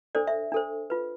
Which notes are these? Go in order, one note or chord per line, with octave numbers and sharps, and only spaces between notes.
D4 A4 C5 D5
E5
D4 A4 C5
F4 B4